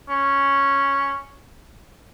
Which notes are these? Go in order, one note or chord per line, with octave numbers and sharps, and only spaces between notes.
C#4